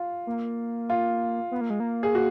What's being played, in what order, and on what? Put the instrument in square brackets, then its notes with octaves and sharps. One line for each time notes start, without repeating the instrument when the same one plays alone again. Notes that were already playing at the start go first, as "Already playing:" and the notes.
Already playing: [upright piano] F4
[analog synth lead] A#3
[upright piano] F4
[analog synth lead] B3
A#3
G#3
A#3
[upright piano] G#4
F#4